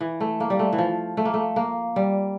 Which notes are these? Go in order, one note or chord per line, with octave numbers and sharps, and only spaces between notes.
E3
A3
A#3
G3
A3
E3
F3
A3
A#3
A3
A#3
G3